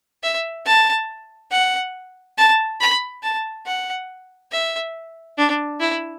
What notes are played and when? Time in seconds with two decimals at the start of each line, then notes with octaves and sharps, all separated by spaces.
0.23 E5
0.66 A5
1.51 F#5
2.38 A5
2.80 B5
3.23 A5
3.66 F#5
4.52 E5
5.38 D4
5.80 E4